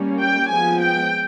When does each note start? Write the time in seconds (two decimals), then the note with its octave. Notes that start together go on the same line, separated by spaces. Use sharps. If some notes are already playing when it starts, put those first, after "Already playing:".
Already playing: G3 A#3 C#4
0.19 G5
0.49 F3 G#3 B3 G#5
0.80 G5